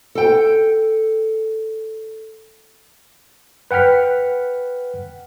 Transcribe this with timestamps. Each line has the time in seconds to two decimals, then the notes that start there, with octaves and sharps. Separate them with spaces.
0.15 A4 G5
3.71 B4 F#5 G5 F6 B6